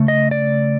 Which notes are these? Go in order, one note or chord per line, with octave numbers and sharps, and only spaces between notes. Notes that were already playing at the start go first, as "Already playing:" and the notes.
Already playing: C#3 A3
D#5
D5